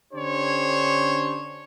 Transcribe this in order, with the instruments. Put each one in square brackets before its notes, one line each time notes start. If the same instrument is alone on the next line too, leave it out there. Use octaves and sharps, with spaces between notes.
[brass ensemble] D3 C#4 D4 G4 C5 C#5